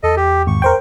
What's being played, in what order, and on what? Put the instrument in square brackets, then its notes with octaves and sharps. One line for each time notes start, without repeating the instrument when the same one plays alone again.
[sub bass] E2 [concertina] A4 D#5
[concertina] G4
[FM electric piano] G#1 [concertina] C#6
[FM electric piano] A#4 C5 G5